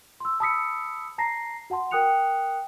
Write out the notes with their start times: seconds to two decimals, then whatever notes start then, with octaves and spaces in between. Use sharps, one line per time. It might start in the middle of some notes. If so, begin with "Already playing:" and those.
0.20 C6 E6
0.40 A5 B5 D#6 E6 B6 C#7
1.18 A5 A#5 A#6 C7
1.70 F#4 F#5 A5 C6
1.91 A#4 G5 D#6 F#6 C#7 F7